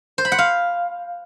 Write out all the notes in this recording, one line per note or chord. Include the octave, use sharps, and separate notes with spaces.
C5
B5
F#5
F5